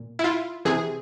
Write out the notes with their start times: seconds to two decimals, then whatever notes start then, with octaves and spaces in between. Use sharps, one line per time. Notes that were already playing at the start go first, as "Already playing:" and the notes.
Already playing: A#2
0.19 E4
0.24 F4
0.65 C3 E3 G#4